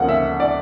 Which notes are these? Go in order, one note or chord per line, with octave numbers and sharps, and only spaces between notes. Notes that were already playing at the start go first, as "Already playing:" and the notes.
Already playing: D2 C#3 F3 A#3 F#5
E5
D5